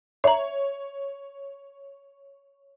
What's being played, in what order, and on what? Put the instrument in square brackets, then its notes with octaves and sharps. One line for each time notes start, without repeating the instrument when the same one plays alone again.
[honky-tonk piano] C#5 [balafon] E5 A#5